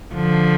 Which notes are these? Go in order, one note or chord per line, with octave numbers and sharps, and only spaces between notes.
D3 F3